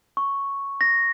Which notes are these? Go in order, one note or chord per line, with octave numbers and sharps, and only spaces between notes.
C#6
A#6